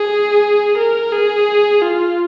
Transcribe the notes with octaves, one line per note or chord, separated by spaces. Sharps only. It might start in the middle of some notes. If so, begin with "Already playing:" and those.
Already playing: G#4
A#4
G#4
F4